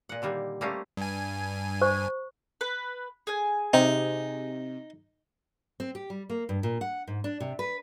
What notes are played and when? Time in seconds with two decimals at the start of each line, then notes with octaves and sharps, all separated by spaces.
0.09 A#2 F#5
0.22 D3 D#3 G3 A#3
0.61 G3 A3 A#3 C#4 C5 F5
0.97 G2 G#5
1.82 C5 C#6
2.61 B4
3.27 G#4 G#5
3.73 C3 D#4
5.80 C4
5.95 G4
6.10 G3
6.30 A#3
6.49 G2
6.63 A#2
6.81 F#5
7.07 G#2
7.24 D4
7.40 C3
7.59 B4